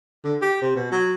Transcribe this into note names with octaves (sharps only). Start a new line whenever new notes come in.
D3
G4
C3
B2
F#3